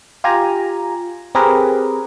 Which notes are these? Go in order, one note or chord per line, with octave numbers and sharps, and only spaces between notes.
F4 G4 G#5 A#5
C4 G4 G#4 A#4 B4